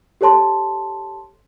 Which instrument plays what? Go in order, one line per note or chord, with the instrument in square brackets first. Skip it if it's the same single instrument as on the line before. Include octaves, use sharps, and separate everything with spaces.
[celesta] G4 A4 C#5 A5 C6